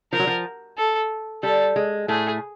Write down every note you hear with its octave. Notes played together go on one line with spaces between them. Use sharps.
F3 A#4
F#3
F3
A4
G3 A4
G#3
A2 A3 G#4